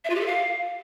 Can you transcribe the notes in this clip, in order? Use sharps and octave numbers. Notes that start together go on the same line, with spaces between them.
E5
F4
G4
A4
F5